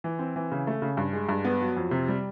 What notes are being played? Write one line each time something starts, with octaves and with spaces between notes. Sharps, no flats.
E3
C4
E3
C#3
A3
C#3
G2
G#3
G2
B3
F#3
F2
C3
G3